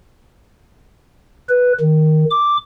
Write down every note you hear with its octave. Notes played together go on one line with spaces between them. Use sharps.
B4
D#3
D6